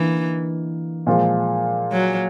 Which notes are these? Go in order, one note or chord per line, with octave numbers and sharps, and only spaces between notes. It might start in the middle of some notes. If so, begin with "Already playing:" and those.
Already playing: D3 E3 A#3 D#4
A#2 F3 G#3
F#3